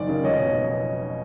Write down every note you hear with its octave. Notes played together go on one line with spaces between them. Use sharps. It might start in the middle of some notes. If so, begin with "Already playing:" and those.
Already playing: F#1 D#3 D5
C#3
F1 C#5 D#5
B2